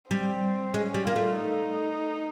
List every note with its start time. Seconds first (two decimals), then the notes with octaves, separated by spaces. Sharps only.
0.10 G3 C4
0.74 G#3 C#4
0.94 G3
1.05 A#3 F4
1.16 A3
1.37 D#4